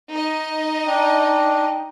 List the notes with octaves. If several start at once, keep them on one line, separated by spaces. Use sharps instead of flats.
D#4 D#5
D4 G5